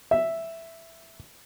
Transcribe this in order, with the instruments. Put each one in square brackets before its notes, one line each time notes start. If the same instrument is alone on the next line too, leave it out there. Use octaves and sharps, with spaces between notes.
[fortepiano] E5